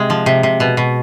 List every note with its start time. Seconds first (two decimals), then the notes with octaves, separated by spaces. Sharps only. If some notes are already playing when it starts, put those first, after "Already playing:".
Already playing: C3 G#3
0.10 F3
0.26 C3
0.43 C3
0.60 B2
0.77 B2